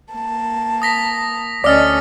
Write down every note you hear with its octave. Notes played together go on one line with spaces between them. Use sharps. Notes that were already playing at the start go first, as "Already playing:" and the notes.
A#3 A5
D#6 A#6 B6
D2 C#4 A4 D5 D#5 D#6 F6 A6